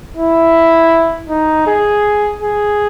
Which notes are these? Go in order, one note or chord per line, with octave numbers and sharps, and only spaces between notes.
E4
D#4
G#4
G#4